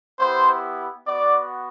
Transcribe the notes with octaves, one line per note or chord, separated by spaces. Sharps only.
B3 E4 G4 C5
B3 F#4 D5